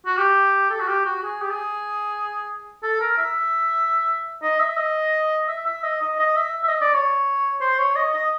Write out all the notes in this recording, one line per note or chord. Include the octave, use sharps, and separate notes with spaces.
F#4
G4
A4
F#4
G4
F#4
G#4
G4
G#4
A4
A#4
E5
D#5
E5
D#5
E5
E5
D#5
D#5
D#5
E5
E5
D#5
D5
C#5
C5
C#5
D#5
D#5